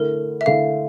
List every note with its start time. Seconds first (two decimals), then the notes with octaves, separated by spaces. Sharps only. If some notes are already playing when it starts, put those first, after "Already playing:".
Already playing: D3 A3 E4 A#4
0.41 E5
0.46 D3 A3 E4 F5